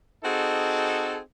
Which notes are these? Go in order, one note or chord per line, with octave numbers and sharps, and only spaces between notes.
C4 D#4 F#4 G#4 A4